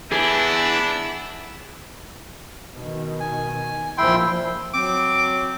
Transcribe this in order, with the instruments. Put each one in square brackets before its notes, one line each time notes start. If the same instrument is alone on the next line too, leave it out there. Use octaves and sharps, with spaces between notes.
[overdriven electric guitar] E3 B3 [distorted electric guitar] D4 [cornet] E4 [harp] G#4
[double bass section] B2 D#3
[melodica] G#5
[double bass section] A#1 F3 [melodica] E4 G5 C6
[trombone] F#3 [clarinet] C4 [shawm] D6